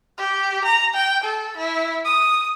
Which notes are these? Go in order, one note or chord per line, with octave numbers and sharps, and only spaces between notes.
G4
A#5
G5
A4
E4
D#6